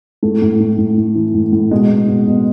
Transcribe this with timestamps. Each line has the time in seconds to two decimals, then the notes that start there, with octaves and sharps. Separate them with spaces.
0.23 A2 A3
0.42 A2
0.60 A2
0.78 A2
0.98 A2
1.15 E3
1.34 A2
1.52 A2
1.71 B2 G#3
1.90 B2
2.08 B2
2.27 B2